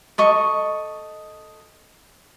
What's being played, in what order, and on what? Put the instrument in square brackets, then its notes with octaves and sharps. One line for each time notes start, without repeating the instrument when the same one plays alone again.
[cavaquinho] A4 D#5 C#6